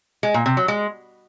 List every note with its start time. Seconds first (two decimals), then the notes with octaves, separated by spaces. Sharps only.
0.23 G#3
0.34 A#2
0.46 C3
0.57 F#3
0.68 G#3